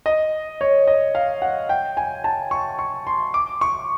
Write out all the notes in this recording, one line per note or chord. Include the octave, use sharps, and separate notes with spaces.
D#5
C#5
D#5
F5
F#5
G5
G#5
A5
C#6
C#6
C6
D6
C#6